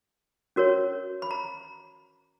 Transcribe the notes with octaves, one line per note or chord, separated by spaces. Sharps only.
C#4 F#4 A#4 C#5
B5
A#5